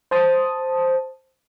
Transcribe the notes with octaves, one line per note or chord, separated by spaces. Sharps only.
C5 A5 D#6